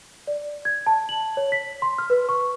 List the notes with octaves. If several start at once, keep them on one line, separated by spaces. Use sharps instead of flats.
D5
G#6
A5
F#7
C#5
B6
C6
F6
B4
C#6